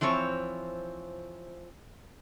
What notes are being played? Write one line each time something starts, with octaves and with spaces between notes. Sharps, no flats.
E3 F3 C4 C#5